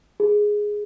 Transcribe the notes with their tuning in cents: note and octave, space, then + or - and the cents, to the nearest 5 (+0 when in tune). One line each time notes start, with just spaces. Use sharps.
G#4 +0